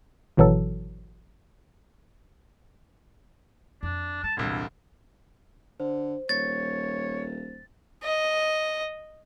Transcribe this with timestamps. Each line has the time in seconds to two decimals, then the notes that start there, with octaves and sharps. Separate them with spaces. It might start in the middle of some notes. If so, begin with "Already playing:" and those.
0.37 G#1 B2 E3 F#3 A4
3.83 F2 D4
4.23 G#3 A5
4.37 E1 C2 A#2 D3 E4
5.80 D3 C5
6.29 D#1 C#5 A6
8.04 D#5